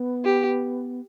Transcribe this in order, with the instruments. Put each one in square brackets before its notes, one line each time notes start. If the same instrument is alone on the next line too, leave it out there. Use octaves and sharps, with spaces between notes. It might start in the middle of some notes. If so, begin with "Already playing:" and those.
Already playing: [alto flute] B3
[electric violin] G4